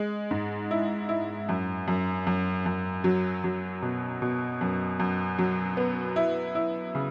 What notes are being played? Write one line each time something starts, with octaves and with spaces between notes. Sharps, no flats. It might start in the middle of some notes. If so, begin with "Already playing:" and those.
Already playing: G#3
G#2
E4
E4
F#2
F#2
F#2
F#2
F#3
F#3
B2
B2
F#2
F#2
F#3
B3
E4
E4
C#3